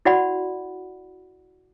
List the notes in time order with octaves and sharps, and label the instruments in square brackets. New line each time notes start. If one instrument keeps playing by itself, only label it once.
[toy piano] E4 F#4 D5 F#5 B5